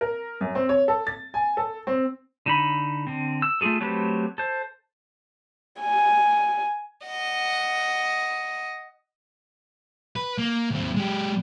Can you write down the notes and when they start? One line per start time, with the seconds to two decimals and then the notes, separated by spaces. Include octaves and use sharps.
0.01 A#4
0.41 F#2
0.55 C4
0.69 C#5
0.88 A4
1.07 A6
1.34 G#5
1.57 A4
1.87 C4
2.46 D3 D#4 B5
3.07 D3 C4
3.42 E6
3.61 A3 F4 F#4 G#4 A4
3.81 F#3 A3 C4 G4 B4
4.38 A4 C5
5.80 G#5
7.06 D#5 F#5
10.16 B4
10.38 A#3
10.71 D#2 C4
10.96 G#3 G4